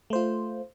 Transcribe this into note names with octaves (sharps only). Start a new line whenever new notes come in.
A3 F4 C5